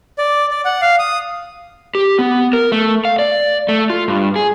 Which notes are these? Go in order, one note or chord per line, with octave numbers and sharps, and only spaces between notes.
D5
D5
F#5
F5
D#6
G4
B3
A#4
A3
F5
D5
A3
F4
G2
G#4